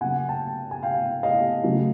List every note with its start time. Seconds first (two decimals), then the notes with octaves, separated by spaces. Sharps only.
0.01 C#3 F#3 A#3 F#5 G#5
0.29 G5 A5
0.71 G#5
0.83 F5 G5
1.23 D#5 F5
1.64 C#3 F#3 A3